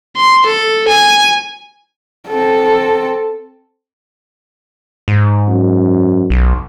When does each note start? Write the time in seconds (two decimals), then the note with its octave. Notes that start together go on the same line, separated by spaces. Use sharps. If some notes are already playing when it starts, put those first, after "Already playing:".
0.16 C6
0.46 A4
0.88 G#5
2.29 C4 A4
5.08 G#2
5.48 F#2
6.30 B1